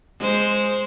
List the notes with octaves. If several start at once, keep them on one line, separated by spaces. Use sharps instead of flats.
G#3 C5